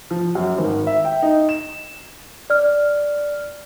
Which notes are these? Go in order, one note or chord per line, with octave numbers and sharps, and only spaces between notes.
F3
F#2
G#1
E5
G5
D#4
E7
D5 F6